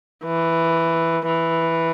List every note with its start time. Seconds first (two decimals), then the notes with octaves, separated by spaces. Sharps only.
0.24 E3
1.27 E3